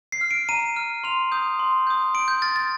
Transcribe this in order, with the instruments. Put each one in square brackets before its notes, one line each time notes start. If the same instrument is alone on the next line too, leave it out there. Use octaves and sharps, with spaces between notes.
[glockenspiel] C7
F6
D7
A#5 D#7
F6
C6 F7
D#6 G6
C6
D#6 G6
C6 D7
G6
F6 A6
A6